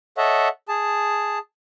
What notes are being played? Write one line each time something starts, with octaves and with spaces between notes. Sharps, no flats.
A4 C#5 D#5 E5 F#5
G#4 A5